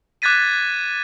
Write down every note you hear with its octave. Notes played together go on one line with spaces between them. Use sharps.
D6 F#6 G#6 A6 B6 D#7